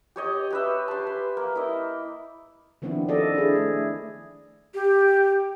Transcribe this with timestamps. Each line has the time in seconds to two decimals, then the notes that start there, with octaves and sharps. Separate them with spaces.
0.16 G4 C#5 D#5
0.50 G4 B4 E5
0.88 A5 C6
1.07 B4
1.37 A#3
1.55 E4 D#5
2.82 D#3 F3 B3 C4 D4 E4
3.09 A4 D5 D#5
3.35 D4 E4 G#4
3.56 A3
4.74 G4